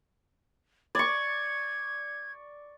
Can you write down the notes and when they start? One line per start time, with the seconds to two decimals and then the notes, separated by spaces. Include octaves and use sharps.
0.95 D5 C#6 G#6